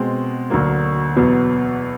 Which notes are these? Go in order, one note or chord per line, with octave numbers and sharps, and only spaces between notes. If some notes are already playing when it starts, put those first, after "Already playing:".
Already playing: B2 G#3 C4
D2 D3 F#3 A#3
E2 B2 F#3 B3